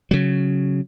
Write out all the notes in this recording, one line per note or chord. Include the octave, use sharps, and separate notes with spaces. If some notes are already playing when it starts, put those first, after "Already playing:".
C#3 F#3